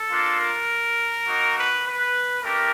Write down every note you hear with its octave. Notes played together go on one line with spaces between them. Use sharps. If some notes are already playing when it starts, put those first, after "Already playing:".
Already playing: A4
A#3 D4 F4
A#4
A#3 D#4 F#4
B4
B4
A3 D4 G4 A#4